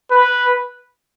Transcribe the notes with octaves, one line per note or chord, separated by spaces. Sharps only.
B4